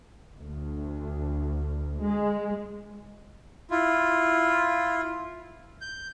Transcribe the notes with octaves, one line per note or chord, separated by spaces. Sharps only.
D2
G#3
E4 F4
G6